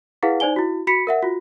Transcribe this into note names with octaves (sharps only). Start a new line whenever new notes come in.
E4 G#4 B4 F5 F#5
D#4 C5 D5 G#5 G7
E4 F#4
F#4 B5 B6 C#7
A#4 E5 F#5
F4 F#4